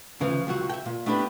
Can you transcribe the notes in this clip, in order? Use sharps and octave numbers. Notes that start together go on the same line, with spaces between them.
D2 C#3 E3 F3
C#2 C3 F#3 F#4
E5 G5
A#2
A3 B3 D4 E4 G4